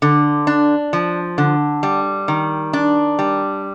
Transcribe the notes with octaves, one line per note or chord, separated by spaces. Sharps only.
D3
D4
F3
D3
G3
D#3
D4
G3